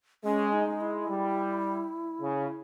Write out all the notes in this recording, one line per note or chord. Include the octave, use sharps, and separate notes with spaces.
G#3 C#4
D#4
G#3
E4
G3
C#3